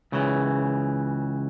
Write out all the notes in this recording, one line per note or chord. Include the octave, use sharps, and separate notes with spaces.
C#2 C#3 E3